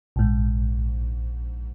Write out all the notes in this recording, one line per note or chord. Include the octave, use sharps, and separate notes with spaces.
A#1 G#2